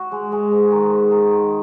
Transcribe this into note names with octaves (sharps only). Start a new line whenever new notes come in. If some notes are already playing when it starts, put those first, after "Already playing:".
Already playing: F#4
G#3
G#3
G#2
D#3
D#4
D#3
D#3